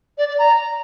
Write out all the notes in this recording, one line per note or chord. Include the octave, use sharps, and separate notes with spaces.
D5
D5
A#5